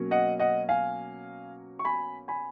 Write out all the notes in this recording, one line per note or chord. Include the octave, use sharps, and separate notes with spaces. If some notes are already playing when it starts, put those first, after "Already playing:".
Already playing: B2 F#3 A#3 C#4
D#5 F#5
D#5 F#5
F5 G#5
C#6
G#5 B5
G#5 B5